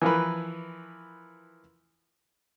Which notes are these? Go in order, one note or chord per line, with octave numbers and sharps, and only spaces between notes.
E3 F3 A#4 B4